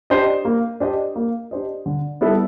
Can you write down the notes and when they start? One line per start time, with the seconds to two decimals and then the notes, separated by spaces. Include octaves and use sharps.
0.10 D4 G4 C5 D#5
0.45 A#3
0.80 D4 G4 C5 D#5
1.15 A#3
1.51 D4 G4 C5 D#5
1.86 D3
2.21 G3 B3 E4 A4